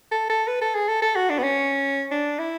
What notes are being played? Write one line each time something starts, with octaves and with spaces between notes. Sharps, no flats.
A4
A4
B4
A4
G#4
A4
A4
F#4
D4
B3
C#4
D4
E4